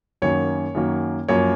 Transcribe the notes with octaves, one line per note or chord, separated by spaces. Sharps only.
F#2 D#3 F#3 A#3 C#4 C#5
F#2 D#3 F#3 A#3 C#4
F#2 F3 A#3 C#5